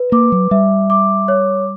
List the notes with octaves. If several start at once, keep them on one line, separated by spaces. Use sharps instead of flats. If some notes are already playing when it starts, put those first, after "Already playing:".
Already playing: B4
A#3 D6
F#3
G3 E5
D6
C#5